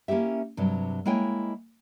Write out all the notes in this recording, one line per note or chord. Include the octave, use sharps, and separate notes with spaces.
A#3 C#4 E4 G4 E5
G2 C3 F#3
G#3 A#3 E4 C#5 G5 G#5